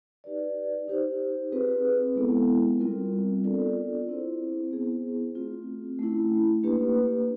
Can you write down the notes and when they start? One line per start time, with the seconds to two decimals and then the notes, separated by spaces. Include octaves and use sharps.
0.24 D#4 G4 B4 D5
0.88 D#4 G4 C5
1.52 C4 F4 G#4 B4
2.16 G#3 B3 E4 A4
2.80 G3 C4 F4 A#4
3.44 B3 D4 F4 A4 D5
4.08 C4 E4 G#4 C5
4.71 B3 E4 G#4 C5
5.35 A3 C4 F4
5.99 A3 C#4 E4
6.63 A#3 D4 G4 B4